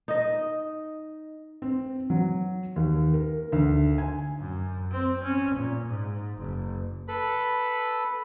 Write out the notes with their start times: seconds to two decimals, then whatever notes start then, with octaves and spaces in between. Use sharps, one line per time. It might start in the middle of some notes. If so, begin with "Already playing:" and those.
0.08 D#4 D#5
1.62 C4
2.10 F#3
2.76 D#2
3.14 A#4
3.52 D2
3.98 G#5
4.39 F#2
4.91 C4
5.24 C#4
5.55 A#2
5.88 G#2
6.37 F#1
7.08 A4 B4 B5